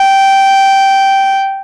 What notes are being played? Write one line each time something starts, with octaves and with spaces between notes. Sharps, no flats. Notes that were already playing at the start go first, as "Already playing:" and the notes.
Already playing: G5